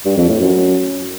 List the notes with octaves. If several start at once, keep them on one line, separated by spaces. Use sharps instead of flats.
G2
F2
A2
F#2